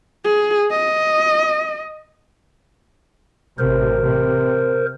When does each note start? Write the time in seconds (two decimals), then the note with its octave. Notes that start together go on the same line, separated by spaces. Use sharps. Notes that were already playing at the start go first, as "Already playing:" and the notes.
0.24 G#4
0.71 D#5
3.59 A1 C3 A#4 C5
4.03 C3